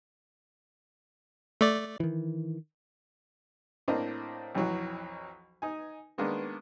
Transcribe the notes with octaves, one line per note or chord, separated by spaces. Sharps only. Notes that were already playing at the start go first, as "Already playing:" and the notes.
A3 D5
D#3 E3
A2 A#3 C4 D4 D#5 A#5
B1 F2 E3 F#3
D#4 G#5
D#3 G#3 A#3 B3 D4